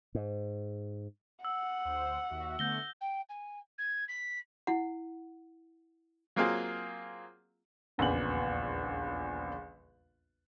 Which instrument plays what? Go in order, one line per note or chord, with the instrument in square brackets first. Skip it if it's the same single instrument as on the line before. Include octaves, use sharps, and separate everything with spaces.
[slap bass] G#2
[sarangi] F#5 [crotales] E6
[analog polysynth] D2 C5
D#2 F#4 E5
[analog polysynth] D3 A3 B3 [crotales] G6 A#6 G7
[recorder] G5
G#5
G#6
B6
[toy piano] E4 F#5
[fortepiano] F#3 A#3 C4 F4 G#4
[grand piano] D#1 A#1 E2 C#3 B3 F#7